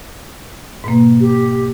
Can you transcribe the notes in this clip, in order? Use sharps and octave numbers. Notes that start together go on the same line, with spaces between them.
G#2 B2 A#3
G4